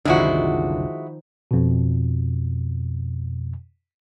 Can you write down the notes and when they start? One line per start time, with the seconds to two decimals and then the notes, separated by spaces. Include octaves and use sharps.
0.05 F#1 C2 D3 D#3 F3 G#3 E4 F#4
1.51 F2 B2